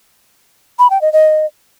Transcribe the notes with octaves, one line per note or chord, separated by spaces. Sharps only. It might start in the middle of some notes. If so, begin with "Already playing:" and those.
B5
G5
D#5
D#5